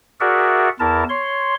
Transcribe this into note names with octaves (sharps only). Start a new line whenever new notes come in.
F#4 G#4 A#4 D5 E5 F#5
E2 E4 A#4 A5
C#5 C6